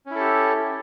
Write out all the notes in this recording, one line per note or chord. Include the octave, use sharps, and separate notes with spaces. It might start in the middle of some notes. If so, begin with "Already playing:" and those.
C#4 E4 G4 A4